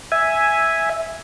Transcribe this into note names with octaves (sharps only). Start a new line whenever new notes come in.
E5 G#5